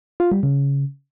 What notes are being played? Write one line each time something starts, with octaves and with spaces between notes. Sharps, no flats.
F4
G3
C#3